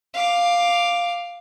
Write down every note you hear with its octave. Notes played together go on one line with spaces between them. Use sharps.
F5 D6